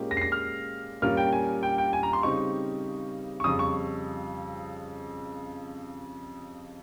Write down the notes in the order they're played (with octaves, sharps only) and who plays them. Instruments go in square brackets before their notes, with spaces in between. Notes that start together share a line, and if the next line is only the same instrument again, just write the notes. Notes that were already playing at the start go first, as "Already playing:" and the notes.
Already playing: [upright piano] A#2 G#3 C#4 G4 A#4
[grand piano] A#6
C7
A#6
F6
[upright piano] A#2 G3 C#4 F4 A#4 [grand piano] F6
[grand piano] G5
G#5
G5
G5
G#5
A#5
C6
[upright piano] C#3 G3 C4 D#4 G4 [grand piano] C#6
[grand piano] C#6
[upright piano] F2 C#3 G3 [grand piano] D#6
[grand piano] C#6